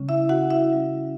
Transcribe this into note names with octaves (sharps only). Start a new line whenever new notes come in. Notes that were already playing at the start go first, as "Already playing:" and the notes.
Already playing: C#3 G3 C#4
E4 E5
F#4 F#5
E4 E5
C#3 G3 C#4 E4